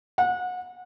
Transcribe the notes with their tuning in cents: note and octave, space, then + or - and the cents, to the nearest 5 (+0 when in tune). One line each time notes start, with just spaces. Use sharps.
F#5 -30